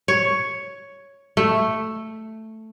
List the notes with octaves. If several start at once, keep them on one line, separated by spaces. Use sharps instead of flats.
C#5
A3